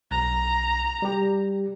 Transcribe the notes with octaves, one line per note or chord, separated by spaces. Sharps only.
B1 A#5
G3 G4